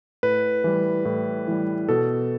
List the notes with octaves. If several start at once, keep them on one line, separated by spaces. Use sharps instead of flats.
A2 B4
E3 G3
A2
E3 G3
B2 A4